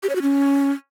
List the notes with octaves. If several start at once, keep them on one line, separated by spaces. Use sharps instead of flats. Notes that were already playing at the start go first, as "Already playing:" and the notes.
G4
C#5
F#4
C#4